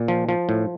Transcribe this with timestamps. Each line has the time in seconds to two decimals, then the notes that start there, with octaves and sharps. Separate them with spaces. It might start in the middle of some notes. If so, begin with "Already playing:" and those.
Already playing: A#2
0.08 F3
0.29 F3
0.49 A2